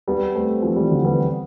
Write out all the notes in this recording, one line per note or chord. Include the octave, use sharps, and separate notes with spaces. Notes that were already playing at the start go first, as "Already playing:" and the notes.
G3 B3
A3 C4
F3 A3
E3 G3
D3 F3
G3 B3